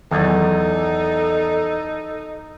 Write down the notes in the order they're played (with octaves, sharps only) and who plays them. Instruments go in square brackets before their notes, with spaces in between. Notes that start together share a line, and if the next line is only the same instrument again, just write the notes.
[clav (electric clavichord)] E2 [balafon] D#3 F#3 [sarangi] D#4 [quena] A4